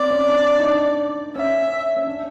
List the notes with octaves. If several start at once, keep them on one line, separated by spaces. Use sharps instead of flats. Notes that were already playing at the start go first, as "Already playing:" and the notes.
Already playing: C4 D5
C#4
D4
D#4
D4
C#4 E5
C#4
D4